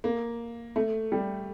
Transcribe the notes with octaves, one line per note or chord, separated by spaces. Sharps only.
A#3
A3
G3